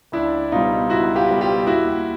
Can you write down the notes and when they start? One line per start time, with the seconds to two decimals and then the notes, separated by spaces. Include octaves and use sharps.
0.12 C#2 D4 E4
0.52 B2 G3 D#4 F4
0.90 C#2 E4 F#4
1.16 F4 G4
1.29 B2 G3
1.41 F4 G4
1.67 D#2 E4 F#4